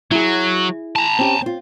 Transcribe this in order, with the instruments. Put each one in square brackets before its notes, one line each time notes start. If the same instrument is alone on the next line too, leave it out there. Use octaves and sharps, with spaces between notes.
[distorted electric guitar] F#3 [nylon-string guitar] E4 G#4
[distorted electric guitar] A5 A#5
[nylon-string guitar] C4 C#4 G4
C4 F4